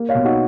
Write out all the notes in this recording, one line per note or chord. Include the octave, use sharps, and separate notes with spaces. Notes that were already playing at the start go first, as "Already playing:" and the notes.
Already playing: A#3
C#5 F5
B2
D#4 F#4